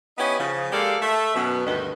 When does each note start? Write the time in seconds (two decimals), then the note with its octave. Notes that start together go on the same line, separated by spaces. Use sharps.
0.18 B3 C#4 D#4 E4 G4 B4
0.39 C#3 F3
0.72 G#3 A#3 G4 A4 D5 F5
1.01 A3 E5
1.34 F#2 B2 B3
1.66 D2 G2 B2 D#3 B4 D#5